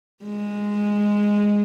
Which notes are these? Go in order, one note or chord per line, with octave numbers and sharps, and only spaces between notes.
G#3